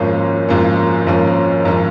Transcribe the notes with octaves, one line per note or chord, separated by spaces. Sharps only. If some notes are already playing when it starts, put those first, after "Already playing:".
Already playing: G#1 G#2 F3 A#3 C#4
G#1 G#2 F3 A#3 C#4
G#1 G#2 F3 A#3 C#4
G#1 G#2 F3 A#3 C#4